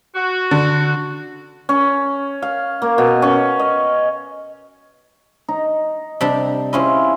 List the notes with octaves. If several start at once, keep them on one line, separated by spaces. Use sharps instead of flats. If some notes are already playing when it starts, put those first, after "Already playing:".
F#4
D3
C#4
F5
A#3
B2
C#4
D#5
D#4
C3 G3 D4
C4 C#4 E4 F4 G#4 D#5